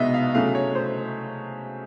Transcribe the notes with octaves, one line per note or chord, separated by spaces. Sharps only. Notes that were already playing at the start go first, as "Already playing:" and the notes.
Already playing: C2 B2 G#3 B3 D#4 D#5 E5
F5
C#3 F#3 A3 F5
C#5
C5